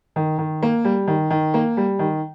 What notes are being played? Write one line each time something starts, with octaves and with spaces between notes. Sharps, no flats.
D#3
D#3
A#3
G3
D#3
D#3
A#3
G3
D#3